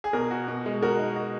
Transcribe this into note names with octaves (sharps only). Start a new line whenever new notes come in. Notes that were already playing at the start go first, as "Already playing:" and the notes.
G#4
B2 A#4
F#4
B2
G#3
F#4 A#4
D#4
F#4